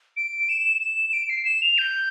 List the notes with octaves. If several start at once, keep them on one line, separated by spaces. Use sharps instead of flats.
D7
E7
E7
E7
D7
C7
E7
F7
G6